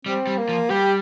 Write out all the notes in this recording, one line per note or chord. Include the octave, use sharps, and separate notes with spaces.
G3 C4
G3
A#3
F3
G3 G4